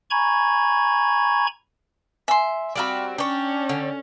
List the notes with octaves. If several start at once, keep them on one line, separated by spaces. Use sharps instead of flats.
G#5 A#5 B5 C#6 G#6
E5 G#5 C6
G3 C4 F#4 D5 F5 B5
C#4 D4 C#5 G5
D3